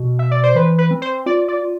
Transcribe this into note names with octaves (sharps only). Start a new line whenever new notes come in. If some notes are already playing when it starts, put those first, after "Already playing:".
Already playing: B2
E5
D5
C5
E3 B4
B4
C4
C5
F4 D5
F4 D5
F4